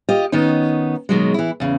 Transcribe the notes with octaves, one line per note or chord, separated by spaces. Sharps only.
F4 G4 D#5
D#3 B3 C#4 D#4
B2 D#3 F#3 G#3
E3 E4
E2 C#3